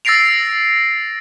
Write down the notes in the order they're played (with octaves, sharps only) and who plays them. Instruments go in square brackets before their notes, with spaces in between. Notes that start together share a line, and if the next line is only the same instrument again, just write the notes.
[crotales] E6 A6 A#6 C7 D7 F7